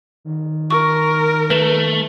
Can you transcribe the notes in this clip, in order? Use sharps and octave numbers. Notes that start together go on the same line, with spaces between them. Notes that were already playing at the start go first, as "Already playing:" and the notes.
D#3
A#4 C#6
A3 B4 E7